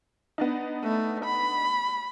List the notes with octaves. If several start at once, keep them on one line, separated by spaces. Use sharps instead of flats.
B3 D4 D#4
A3
B5